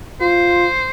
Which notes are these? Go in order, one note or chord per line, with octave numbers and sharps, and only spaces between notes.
F4 C5